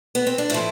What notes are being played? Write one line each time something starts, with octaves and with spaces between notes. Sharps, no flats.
B3
C4
D4
A2 F3 E4